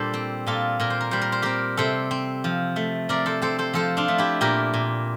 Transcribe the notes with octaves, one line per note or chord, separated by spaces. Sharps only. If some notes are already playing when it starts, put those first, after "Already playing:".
Already playing: A#2 G3 D4 A4 C5 D5
C4
A#2 F4 A4
A#2 A#4
C5
A#4
G3 C5
A#4
C5
C4 G4 A#4
C3 A4 C5
C4
F3
A3
C3 A#4 D5
A4 C5
C4 A4 C5
A4 C5
F3 A4 C5
D4 F4
A3
E4 G4
A#2 G4 A#4
A#2